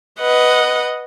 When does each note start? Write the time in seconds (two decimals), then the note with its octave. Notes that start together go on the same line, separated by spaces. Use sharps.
0.19 B4 D#5 F#5